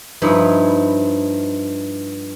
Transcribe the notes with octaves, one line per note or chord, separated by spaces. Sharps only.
G2 F3 D#4 E4